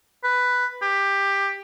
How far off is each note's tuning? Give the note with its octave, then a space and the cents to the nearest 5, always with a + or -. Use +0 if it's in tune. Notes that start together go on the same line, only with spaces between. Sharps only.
B4 +5
G4 +15